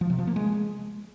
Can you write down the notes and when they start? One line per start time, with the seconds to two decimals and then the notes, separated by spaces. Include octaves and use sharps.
0.01 F3
0.10 C3
0.19 F3
0.27 A#3
0.36 G#3